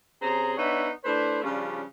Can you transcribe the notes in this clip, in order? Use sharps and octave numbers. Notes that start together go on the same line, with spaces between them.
C3 C#4 G#4 C5 A#5
B3 D4 D#4 C#5 E5 F#5
A3 D4 E4 B4 C5
C#3 F3 G3 C#4 D4 F4